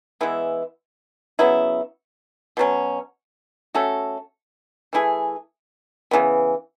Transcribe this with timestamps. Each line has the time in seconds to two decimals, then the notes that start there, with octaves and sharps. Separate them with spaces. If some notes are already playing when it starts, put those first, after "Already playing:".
0.21 E3 G#3 B3 E4
1.39 C#3 F#3 B3 E4
2.57 B2 F#3 C#4
3.75 A3 C#4 F#4 A4
4.93 E3 A3 E4 G#4
6.11 C#3 E3 B3